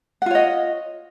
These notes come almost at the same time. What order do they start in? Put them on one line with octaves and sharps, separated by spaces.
F#5 F4 C#5 D#5